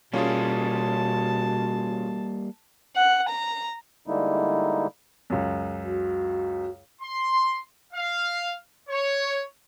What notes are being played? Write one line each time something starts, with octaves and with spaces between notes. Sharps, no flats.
B2 G3 A#3 C#4 F4 G#4 A5
F#5
A#5
D3 G3 G#3 A#3 D#4 E4
C#2 F#2
F#4
C6
F5
C#5